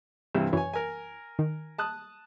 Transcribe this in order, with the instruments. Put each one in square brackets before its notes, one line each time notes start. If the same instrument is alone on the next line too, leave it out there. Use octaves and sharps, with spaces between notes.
[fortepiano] G2 C3 E3
[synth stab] F#2 E3 [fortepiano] C#5 G#5
[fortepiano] A#4 G#5
[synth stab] D#3
[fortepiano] A5 D#6 F#6